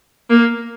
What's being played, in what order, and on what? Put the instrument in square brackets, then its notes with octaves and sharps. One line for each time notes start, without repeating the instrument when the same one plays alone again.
[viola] A#3